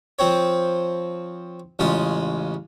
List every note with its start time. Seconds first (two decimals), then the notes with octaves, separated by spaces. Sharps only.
0.19 F3 C4 C#5
1.79 A1 C#3 G#3 F4 D#6